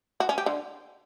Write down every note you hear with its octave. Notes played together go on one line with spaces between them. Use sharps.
F#4
C#4
G4
D3